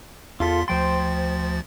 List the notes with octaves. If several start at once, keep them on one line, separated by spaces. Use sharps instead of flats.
E2 F4 A4 C6 B6
D2 F3 C5 G5 C6 A6